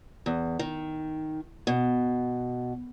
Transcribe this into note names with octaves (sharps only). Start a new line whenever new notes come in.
E2
D#3
B2